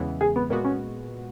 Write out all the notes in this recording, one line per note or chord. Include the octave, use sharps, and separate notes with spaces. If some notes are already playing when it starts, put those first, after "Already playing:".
Already playing: E2 C#3 E3 G#3 B3
G#4
B3
A#2 G#3 A#3 B3 F#4
C#4